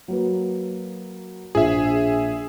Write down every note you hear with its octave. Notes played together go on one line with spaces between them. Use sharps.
F#3 A#3 B4
A#1 G#4 E5